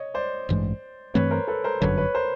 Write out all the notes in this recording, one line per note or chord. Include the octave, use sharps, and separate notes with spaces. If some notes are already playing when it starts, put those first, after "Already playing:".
Already playing: C#5 D#5
C5 D5
A1 G2 E3 G#3
G2 E3 A3 C4 B4 C#5
A#4 C5
A4 B4
A#4 C5
G1 F#2 D3 F#3 B4 C#5
B4 C#5
A#4 C5